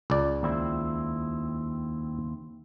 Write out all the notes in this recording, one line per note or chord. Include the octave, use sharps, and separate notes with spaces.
C#2 D5
D#2 C4 E4